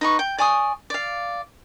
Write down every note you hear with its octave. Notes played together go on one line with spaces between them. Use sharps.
D#4 B4 C#6
G5
D5 G#5 C#6 D#6
D5 F5